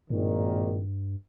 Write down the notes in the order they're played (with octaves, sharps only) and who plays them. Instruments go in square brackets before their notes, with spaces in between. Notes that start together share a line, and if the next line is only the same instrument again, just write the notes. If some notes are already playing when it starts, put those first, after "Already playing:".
[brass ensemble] G#1 A#2 D#3 [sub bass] G2